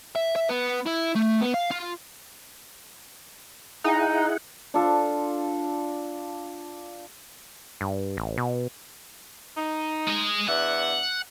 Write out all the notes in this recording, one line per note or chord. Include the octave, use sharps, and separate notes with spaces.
E5
E5
B3
E4
A3
B3
F5
F4
D#4 E4 G#4 F#5
D4 F4 A4
G2
A1
B2
D#4
G#3 D#5
E2 D4 E5 F#5